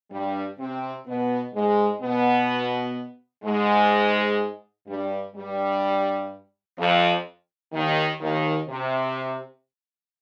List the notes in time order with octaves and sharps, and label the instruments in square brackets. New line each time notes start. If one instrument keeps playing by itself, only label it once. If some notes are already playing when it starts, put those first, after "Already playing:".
[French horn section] G2 G3
C3 C4
B2 B3
G#2 G#3
B2 B3
G#2 G#3
G2 G3
G2 G3
F2 F3
D#2 D#3
D#2 D#3
C3